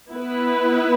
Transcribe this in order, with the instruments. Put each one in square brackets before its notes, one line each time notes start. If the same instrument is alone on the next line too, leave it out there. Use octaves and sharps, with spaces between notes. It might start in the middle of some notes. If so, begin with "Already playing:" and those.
[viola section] B3 E4 B4